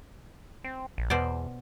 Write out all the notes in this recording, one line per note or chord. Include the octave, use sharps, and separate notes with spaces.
C4
A#1
E2 B2 C5 D5